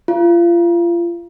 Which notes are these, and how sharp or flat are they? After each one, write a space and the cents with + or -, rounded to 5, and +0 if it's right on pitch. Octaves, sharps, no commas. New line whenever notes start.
F4 -30